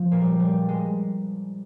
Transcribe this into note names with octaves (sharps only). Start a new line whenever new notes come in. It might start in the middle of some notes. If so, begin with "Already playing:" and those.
Already playing: F3
A#2 A#3
G3
G3
G#3